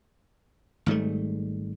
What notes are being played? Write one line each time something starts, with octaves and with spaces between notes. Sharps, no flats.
G#1 G#2 G3 A3